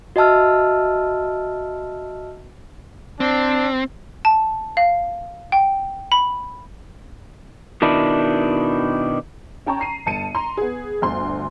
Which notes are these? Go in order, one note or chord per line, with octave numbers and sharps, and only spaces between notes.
F#4 D#5 E5 A5 E6 F6
C4 D4
A5
F5
G5
B5
B2 D#3 D4 E4
C#4 G5 A5 A#5 C#6
A#5 C7 D#7
G1 A5 C#7 D#7
A#5 C6
B3 G#4
G1 D2 C6